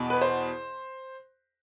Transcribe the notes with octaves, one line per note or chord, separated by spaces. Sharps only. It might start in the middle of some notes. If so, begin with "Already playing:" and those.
Already playing: E2 B2
B4
C5